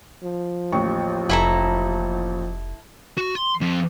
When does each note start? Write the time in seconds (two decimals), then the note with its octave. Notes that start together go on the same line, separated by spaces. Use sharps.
0.23 F3
0.72 A1 D#2 C#6
1.29 F1 E4 A4 A#5
3.17 F#4
3.35 C6
3.61 F2